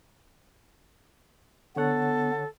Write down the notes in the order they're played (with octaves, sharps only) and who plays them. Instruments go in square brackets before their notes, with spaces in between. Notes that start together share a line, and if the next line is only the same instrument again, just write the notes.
[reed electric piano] D3 C#5 F#5 [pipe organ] B3 [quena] A4